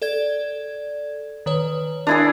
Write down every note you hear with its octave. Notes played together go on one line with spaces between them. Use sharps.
A4 D5 G#6
D#3 B4 C#5
D4 E4 G#4 A#4